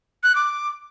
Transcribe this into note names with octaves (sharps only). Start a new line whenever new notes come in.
F#6
D6